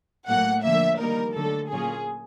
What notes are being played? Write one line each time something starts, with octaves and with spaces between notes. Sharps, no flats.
A2 F#3 A#3 F#5
D3 F3 A#3 E5
D#3 G3 A#3 D#4 A#4
D3 F#3 A3 A4
A#2 F#3 A#3 C#4 F4 G#4